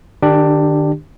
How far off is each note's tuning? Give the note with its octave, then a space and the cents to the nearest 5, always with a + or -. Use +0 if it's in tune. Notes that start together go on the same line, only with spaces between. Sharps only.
D#3 -40 D4 +15 G4 +0